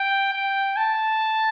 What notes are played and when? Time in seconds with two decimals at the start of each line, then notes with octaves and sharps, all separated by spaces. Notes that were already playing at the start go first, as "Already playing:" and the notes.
Already playing: G5
0.33 G5
0.77 A5